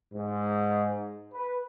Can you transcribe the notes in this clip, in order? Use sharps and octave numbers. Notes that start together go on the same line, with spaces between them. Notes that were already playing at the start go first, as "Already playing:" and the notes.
G#2
B4